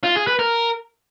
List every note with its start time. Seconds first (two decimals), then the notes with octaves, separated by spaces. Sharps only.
0.04 F4
0.16 G#4
0.27 B4
0.39 A#4